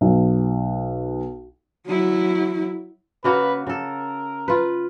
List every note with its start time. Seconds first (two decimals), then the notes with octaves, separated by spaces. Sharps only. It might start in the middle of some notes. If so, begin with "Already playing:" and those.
0.01 B1
1.87 F#3 E4
3.24 C#3 A#3 F#4 B4
3.67 C#3 A4 A#4
4.48 F4 B4